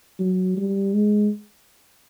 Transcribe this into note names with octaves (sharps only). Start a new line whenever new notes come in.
F#3
G3
G#3